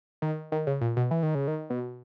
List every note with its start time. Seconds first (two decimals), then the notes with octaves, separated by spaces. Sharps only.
0.22 D#3
0.52 D#3
0.67 C#3
0.81 A#2
0.97 B2
1.11 E3
1.23 D#3
1.35 C#3
1.48 D#3
1.70 B2